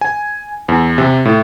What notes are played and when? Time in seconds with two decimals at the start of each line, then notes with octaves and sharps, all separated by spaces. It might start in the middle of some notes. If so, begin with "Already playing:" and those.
0.01 G#5
0.68 E2
0.98 C3
1.25 A2